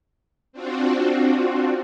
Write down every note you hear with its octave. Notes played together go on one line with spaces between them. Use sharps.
C4 D4 F4 F#4